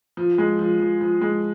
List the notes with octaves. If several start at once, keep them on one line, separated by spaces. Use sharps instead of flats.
F3
G#3
F3
F3
F3
G#3